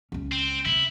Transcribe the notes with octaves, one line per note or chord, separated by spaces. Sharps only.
C#2 C#4
C4
C3 E4